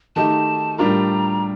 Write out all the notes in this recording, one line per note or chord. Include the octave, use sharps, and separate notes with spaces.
D#3 A3 D#4 G4 A5
A2 G3 D4 F4 A#4 A#5